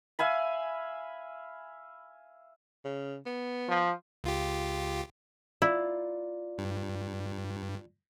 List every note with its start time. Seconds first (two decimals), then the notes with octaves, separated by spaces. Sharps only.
0.19 E5 F5 G#5 B5
2.85 C#3
3.26 B3
3.68 F3
4.24 C#2 F4 G4
5.62 E4 F4 D5
6.58 G2